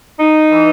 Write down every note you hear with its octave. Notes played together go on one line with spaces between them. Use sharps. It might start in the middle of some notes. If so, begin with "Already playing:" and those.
D#4
E3